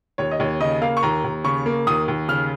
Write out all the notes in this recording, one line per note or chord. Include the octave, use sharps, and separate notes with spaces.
D#2 C#5
D#5
D#2 C#5
C#3 D#5
A#3 F5
C#6
D#2 A#5
D#2
C#3 C#6
A#3
D#2 D#6
D#2
C#3 F6